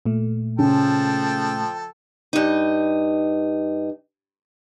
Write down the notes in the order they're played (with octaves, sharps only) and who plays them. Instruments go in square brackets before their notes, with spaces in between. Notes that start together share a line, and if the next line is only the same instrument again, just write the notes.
[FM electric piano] A#2 A3
[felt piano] C#3 [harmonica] F3 A4 G5
[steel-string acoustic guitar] G2 D#4